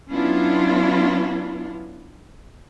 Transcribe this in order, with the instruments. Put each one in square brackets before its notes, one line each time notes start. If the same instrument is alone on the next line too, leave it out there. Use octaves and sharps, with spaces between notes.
[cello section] F#3 B3 C#4 D4 E4 F4